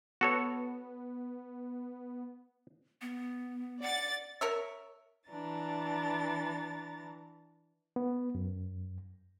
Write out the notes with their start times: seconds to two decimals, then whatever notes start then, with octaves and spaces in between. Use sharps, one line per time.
0.21 B3 F#4 A4 C#5
3.01 B3
3.82 D5 F#5 A6
4.41 A#4 C#5 E5
5.29 E3 D4 A#5 A6
7.96 B3
8.35 F#2